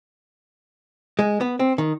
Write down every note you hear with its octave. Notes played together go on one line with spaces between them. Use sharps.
G#3
B3
C4
D#3